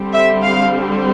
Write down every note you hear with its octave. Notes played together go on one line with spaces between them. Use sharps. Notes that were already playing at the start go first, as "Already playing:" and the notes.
Already playing: D3 G3 C4
E5
F5